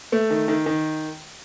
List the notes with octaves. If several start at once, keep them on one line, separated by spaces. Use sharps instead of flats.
A3
D#3
D#3
D#3